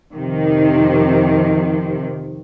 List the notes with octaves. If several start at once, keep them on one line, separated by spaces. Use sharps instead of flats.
F2 C3 D#3